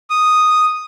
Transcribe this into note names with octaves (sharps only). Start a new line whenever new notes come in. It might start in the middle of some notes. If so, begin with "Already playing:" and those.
D#6